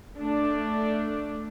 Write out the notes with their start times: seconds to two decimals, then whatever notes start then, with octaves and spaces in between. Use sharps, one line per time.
0.18 A3 D4